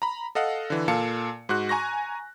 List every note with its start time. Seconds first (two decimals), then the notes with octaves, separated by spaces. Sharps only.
0.02 A#5 B5
0.35 A4 D#5 F5 F#5
0.70 D3 E3
0.88 A#2 A4 F5 A5 C#7
1.49 G#2 F#4 F#6
1.69 G#5 A#5 C#6 A#6